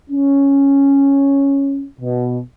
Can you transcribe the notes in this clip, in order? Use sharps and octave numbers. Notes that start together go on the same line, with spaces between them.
C#4
B2